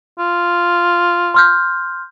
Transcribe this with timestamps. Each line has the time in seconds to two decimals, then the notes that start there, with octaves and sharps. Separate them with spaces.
0.19 F4
1.34 C6 F6 G6